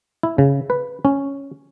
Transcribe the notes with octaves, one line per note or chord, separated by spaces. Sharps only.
E4
C#3
B4
C#4